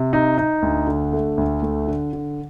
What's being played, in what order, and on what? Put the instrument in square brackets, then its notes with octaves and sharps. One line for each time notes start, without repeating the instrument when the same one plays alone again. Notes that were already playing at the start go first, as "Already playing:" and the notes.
Already playing: [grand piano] C3
D#4
D#4
D2
D3
A3
D2
A3
D3
D3